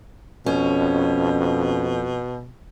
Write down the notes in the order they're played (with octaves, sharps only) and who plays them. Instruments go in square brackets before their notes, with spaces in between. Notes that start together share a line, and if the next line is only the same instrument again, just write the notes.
[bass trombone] F2 [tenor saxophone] B2 [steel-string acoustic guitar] C#4